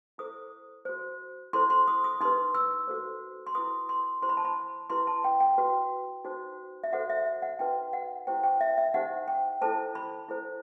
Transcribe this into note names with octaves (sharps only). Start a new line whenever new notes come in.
E4 A4 C5 D#6
F#4 C5
E4 A4 C5 C6
C6
D#6
D#6
D#4 G4 B4 C6
E6
F#4 A4 C5
C6
E4 B4 D#6
C6
E4 G4 C5 C6
B5
A5
B5
E4 G4 B4 C6
A5
G5
G5
F#4 B4
D#4 F#4 C5
E5
F#4 A4 C5 F#5
E5
E5
F#5
D#4 F#4 B4 G5
F#5
E4 G4 C5 G5
G5
E5
E5
D#4 G4 C5 F#5
G5
E4 A4 C5 A5
B5
E4 A4 C5